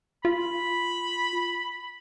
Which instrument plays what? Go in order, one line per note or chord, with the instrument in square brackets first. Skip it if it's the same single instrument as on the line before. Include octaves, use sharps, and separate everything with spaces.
[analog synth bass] F4 [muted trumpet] B5